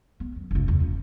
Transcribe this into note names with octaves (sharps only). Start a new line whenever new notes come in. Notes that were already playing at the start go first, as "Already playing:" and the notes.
B3
F#2
F#1 C#2
E2
C#3